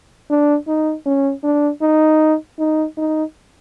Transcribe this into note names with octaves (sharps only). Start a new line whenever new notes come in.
D4
D#4
C#4
D4
D#4
D#4
D#4